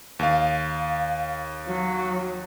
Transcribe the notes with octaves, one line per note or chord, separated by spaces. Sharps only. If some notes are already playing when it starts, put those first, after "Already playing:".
D#2 F5
F#3